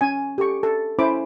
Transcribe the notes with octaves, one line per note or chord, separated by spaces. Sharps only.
C#4 G#5
G4 A4 C#6
A4
C#4 E4 C5 B5 D6